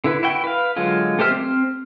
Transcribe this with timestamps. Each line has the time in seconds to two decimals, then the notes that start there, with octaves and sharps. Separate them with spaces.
0.04 D3 E4 B4
0.23 E4 F#4 G5
0.44 B4 F5
0.76 D3 F#3 G#3 F4
1.19 A3 G4 C5 E5 F6
1.30 C4 F6